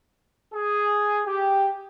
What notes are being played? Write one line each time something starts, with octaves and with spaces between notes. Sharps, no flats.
G#4
G4